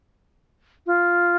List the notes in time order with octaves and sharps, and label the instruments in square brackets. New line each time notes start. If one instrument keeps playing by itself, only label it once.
[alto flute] F4